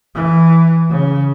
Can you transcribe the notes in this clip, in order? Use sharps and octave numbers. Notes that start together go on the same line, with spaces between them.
E3
C#3